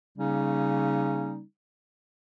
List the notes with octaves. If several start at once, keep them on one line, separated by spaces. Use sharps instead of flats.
C#3 G3 A#3 C#4 D#4